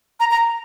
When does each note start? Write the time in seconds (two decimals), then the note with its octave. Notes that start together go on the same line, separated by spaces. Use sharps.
0.20 A#5
0.31 A#5